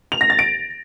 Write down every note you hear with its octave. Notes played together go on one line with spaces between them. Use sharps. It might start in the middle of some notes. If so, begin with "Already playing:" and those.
F7
A#6
A6
D7